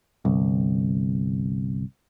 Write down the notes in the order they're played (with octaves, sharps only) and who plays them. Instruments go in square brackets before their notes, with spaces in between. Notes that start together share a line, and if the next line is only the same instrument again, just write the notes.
[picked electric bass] G1 C2